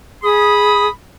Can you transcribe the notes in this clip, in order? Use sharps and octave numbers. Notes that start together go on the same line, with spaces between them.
G#4 B5 D#6